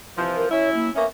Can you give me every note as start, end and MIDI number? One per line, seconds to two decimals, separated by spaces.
0.17 0.45 48
0.17 0.45 52
0.17 0.45 53
0.37 0.48 70
0.51 0.90 54
0.51 0.90 61
0.51 0.90 64
0.51 0.70 73
0.75 0.91 58
0.95 1.06 58
0.95 1.06 59
0.95 1.06 61
0.95 1.05 76